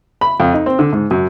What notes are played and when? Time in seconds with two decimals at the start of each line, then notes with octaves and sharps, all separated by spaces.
0.21 B5
0.40 F2
0.54 D#4
0.66 C4
0.79 D3
0.93 G#2
1.11 F#2